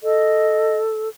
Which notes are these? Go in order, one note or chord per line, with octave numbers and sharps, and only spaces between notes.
A4 D#5